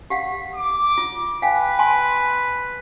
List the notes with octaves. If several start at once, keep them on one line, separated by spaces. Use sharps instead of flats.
G4 F5 F#5
D6
F4
B4 F5 G5 G#5
G#5 A5 C6